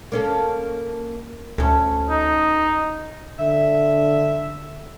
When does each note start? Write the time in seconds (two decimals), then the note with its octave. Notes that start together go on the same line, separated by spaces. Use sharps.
0.12 A#3 C#4 A4
1.58 D2 C#4 A4
2.09 D#4
3.39 D3 E5